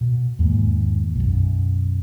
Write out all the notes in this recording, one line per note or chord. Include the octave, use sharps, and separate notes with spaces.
B2
E2 G#2 D#3 A#3
B1 F#2